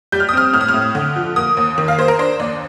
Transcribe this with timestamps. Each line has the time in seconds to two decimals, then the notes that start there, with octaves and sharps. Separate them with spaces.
0.12 G3 G6
0.20 F6
0.29 D#6
0.33 C4 F6
0.53 A2 F6
0.61 D#6
0.68 F6
0.74 A2
0.95 D3
1.16 F3
1.36 A#3 D#6
1.57 D#2
1.78 D#3
1.88 F5
1.98 A#3 C5
2.08 A#4
2.19 D4 C5
2.39 D#2 D5